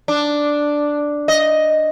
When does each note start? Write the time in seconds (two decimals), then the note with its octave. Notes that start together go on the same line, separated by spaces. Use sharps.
0.08 D4
1.28 D#5